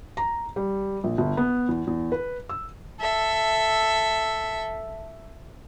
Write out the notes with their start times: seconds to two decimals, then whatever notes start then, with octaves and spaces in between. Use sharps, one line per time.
0.17 A#5
0.56 G3
1.04 A#1
1.18 G1
1.37 B3
1.69 E2
1.87 E2
2.12 B4
2.49 E6
3.00 A4 E5